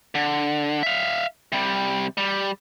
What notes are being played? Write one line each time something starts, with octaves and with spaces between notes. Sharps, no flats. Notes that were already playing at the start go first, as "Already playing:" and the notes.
D3
E5 F5
C3 G3
G3